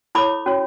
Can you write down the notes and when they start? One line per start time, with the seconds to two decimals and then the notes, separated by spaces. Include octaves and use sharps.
0.15 E4 A4 C#5 B5 D6
0.46 C#4 F#4 C#5